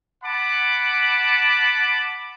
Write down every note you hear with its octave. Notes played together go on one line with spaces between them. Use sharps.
F#5 A5 B5 D6